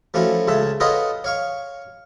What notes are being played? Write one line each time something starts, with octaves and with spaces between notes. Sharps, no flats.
F3 A3 C#4 E4 F#4
C#2 C#3 A4 E5 A5
F4 A4 B4 C#5 D#5 F#5
C#5 F5 C#6